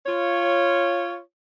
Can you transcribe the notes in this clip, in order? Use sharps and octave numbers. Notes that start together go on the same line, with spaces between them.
F4 C#5